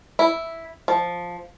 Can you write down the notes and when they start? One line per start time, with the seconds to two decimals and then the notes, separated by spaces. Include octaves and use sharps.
0.19 E4
0.88 F3